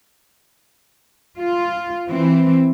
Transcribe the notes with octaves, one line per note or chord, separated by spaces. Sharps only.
F4
E3 C4